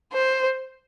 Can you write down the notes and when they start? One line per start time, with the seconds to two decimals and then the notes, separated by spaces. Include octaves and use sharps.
0.13 C5